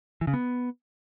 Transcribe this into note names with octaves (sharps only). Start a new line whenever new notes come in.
E3
C#3
B3